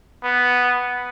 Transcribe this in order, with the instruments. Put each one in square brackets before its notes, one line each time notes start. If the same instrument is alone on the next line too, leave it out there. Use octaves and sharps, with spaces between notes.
[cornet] B3